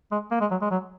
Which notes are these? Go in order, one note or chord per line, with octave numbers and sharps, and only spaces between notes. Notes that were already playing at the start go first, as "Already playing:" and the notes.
G#3
A#3
G#3
F#3
G#3
F#3